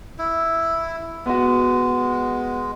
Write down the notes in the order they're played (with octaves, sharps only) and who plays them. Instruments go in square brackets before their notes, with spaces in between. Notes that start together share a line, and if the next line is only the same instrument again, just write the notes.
[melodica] E4
[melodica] G#3 [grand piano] B3 F#4